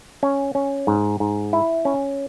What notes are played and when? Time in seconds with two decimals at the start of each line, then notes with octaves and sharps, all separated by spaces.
0.23 C#4
0.55 C#4
0.87 G#2
1.20 G#2
1.53 E4
1.85 C#4